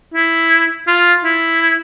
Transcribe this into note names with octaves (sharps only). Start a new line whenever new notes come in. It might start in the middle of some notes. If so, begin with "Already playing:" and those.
E4
F4
E4